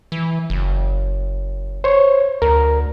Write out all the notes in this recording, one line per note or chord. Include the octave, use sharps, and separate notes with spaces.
E3
F#1
C5 C#5
D2 A#4